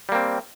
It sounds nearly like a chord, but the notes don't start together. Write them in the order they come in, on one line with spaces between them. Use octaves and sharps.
G3 A#3 C4